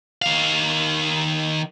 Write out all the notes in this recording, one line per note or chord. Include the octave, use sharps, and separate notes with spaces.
D#3 F5